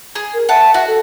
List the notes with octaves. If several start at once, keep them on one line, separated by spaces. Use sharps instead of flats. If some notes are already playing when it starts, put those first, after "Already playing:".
G#4
A#4
E5 F#5 A5
F#4 E5
A4